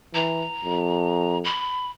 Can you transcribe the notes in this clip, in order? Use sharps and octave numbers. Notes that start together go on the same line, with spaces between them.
E3 A#5
F2
B5